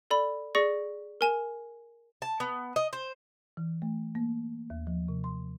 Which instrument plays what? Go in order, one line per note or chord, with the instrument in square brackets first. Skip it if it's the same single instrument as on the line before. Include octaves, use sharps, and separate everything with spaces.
[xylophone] A4 D5 B5
G#4 D5 C#6 A#6 C#7
A#4 G#5 E7
[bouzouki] A5
B3
D#5
C5
[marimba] E3
A3
A#3
D#2
F3
C3
C6